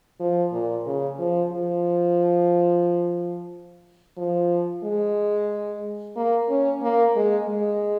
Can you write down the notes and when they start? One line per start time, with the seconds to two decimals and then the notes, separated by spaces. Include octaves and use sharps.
0.20 F3
0.52 A#2
0.86 C#3
1.19 F3
1.52 F3
4.17 F3
4.84 G#3
6.16 A#3
6.49 C#4
6.82 A#3
7.16 G#3
7.49 G#3